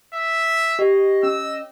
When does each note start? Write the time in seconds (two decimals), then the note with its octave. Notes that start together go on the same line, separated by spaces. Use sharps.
0.14 E5
0.79 G4 D#5
1.23 C#4 E6